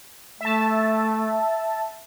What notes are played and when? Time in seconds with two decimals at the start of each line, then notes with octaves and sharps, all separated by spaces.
0.41 A3 E5 A5